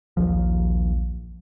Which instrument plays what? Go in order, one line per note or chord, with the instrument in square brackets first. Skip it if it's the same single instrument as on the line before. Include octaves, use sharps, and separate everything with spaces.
[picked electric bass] A#1 D#2 F3